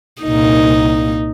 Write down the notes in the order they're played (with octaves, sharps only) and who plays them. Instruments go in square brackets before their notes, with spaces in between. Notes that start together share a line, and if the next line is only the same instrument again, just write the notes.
[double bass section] C2 A#2 A#3 [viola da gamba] D#4